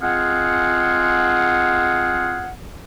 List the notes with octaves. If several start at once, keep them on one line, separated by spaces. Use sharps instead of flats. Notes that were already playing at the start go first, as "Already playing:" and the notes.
G#3 C4 F4 G#4 F5 F#5